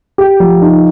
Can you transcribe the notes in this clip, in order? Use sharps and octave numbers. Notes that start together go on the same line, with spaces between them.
G4
F3
D#4